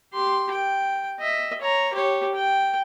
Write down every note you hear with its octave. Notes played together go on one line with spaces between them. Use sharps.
G4 C6
G5
D#5 E5
C#5 A#5
G4 C#5
G5